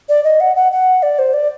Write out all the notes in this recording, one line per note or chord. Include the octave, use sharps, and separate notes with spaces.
D5
D#5
F#5
F#5
F#5
D5
C5
D5